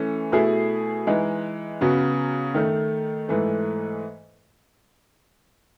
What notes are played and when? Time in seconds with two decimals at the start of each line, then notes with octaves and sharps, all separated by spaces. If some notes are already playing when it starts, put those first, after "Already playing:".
Already playing: E3 A3 C#4
0.32 B2 A3 E4 G#4
1.07 E3 G#3 D#4
1.81 C#3 F#3 B3 F#4
2.54 D#3 A3 D#4
3.29 G#2 E3 A3